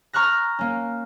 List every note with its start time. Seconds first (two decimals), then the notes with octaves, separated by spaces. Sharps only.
0.13 A#5 C#6 F6 F#6 A#6
0.59 A#3 C#4